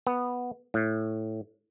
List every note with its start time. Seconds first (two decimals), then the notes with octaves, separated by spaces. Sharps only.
0.07 B3
0.74 A2